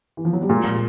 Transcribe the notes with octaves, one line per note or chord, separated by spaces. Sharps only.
E3
F3
F#3
G3
A#2 G#3